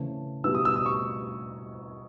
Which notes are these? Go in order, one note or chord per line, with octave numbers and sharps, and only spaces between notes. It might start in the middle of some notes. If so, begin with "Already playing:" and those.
Already playing: C#3 E3 A3 C4
B2 G3 B3 E4 E6
D#6
E6
D#6
C#6